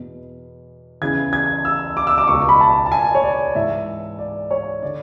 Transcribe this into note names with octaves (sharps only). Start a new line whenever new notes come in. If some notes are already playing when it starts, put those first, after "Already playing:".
Already playing: E2 B2
E2 C#3 E3 G#6
G#6
E6
D6
E6
D6
C#2 B2 C#6
B5
A5
A5
G#5
C#5
D5
G#2 E3 E5
D5
C#5
D3 D5